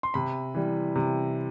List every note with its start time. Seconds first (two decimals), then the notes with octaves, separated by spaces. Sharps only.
0.03 C6
0.14 C3 B5
0.55 E3 G3
0.95 C3